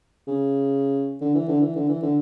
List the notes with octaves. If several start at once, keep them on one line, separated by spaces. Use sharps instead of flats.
C#3
D3
E3
D3
E3
D3
E3
D3